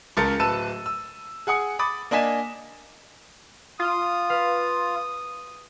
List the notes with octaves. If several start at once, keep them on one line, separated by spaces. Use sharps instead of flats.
C#2 C#3 A#4 A5 A6 C#7
D1 B4 A5 E6 D#7 E7
E6
G#4 F#5 G#5 D#6 C#7
B5 D6 D#6 A6
A#3 D4 D#5 G#5 B6 E7
F4 D#6
B4 F5